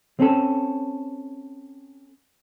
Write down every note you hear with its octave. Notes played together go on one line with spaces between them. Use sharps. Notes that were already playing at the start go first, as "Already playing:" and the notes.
C4 C#4 A4